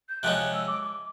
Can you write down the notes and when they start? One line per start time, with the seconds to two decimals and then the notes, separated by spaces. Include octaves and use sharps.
0.09 G6
0.23 C3 F3 G#3 C#4 F#6
0.53 E6
0.67 D6
0.83 D6